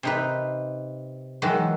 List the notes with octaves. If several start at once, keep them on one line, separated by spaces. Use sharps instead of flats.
C3 D#4 B4
D#3 E3 F#3 G#3